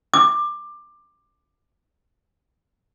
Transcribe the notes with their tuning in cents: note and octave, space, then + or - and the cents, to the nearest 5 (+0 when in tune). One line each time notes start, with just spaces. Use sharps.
D6 +15